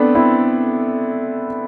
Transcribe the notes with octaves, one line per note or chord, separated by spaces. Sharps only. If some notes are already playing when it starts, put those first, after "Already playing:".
Already playing: A3 B3 C4 D4
C4 E4